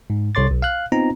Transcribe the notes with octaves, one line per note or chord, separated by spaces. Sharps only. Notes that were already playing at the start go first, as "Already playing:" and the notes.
G#2
C2 A4 C#5 C6 D6 A6
B1
F5 F#6
B3 C4 D#4 F4 A#5